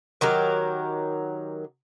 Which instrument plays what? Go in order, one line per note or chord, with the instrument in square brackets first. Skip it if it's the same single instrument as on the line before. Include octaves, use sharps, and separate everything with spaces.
[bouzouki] D#3 F#3 G4 A#4